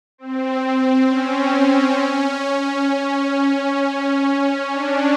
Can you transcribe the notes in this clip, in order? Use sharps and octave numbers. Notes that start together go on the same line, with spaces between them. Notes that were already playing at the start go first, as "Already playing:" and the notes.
C4
C4
C#4
D4